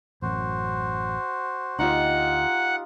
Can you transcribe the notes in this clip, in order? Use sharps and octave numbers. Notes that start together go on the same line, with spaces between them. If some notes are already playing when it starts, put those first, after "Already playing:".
A1 F#2 F#4 C5
D2 D#4 F4 G4 F#5